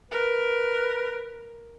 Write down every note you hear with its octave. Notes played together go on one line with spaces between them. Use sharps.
A#4 B4